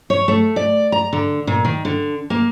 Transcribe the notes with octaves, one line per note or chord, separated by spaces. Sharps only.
C#5
A3
D5
A#5
D3
A#2
D#3
D3
A#3